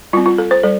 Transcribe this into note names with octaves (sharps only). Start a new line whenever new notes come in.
G3 C4 F4
F4
A4
C5
G3 A4